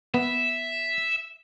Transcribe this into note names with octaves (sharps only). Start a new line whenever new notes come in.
B3 E5